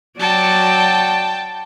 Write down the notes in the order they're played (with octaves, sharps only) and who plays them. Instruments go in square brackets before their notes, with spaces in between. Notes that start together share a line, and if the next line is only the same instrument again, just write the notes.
[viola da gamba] F#3 F#4 D5 [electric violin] G5 A5